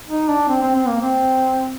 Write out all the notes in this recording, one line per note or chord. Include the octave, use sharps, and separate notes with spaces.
D#4
D4
C4
C4
C4
A#3
C4